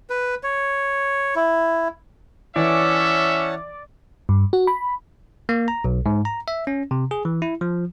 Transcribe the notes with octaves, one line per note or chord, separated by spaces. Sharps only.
B4
C#5
E4
E3 C#4 C#5 D5 E5 F#5 A5
G2
F#4
B5
A#3
A#5
B1
G#2
A#5
E5
C#4
C3
G#4
E3
E4
F3